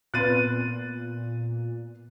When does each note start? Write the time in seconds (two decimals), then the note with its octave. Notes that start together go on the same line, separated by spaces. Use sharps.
0.14 A#2 B3 C4 B4 F#6 A6 D#7